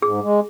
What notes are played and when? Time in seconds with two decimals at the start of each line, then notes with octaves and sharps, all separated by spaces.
0.02 G#2 G#4
0.23 G#3